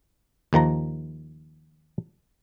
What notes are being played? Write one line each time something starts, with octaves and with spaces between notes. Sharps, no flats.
D#2 D#3 F3 A#5